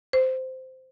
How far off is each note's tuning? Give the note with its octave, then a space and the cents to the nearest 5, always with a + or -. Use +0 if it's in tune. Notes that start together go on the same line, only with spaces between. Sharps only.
C5 -10